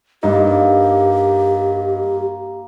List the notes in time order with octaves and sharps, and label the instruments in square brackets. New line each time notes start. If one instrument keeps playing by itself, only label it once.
[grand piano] G2 D#4 [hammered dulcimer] A#3 [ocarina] G4